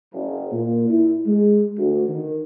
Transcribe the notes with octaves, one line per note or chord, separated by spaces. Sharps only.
F#1
A#2
E4
G#3
D2
D#3